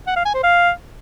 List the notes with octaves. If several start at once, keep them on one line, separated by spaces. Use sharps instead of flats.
F#5
F5
G#5
C5
F5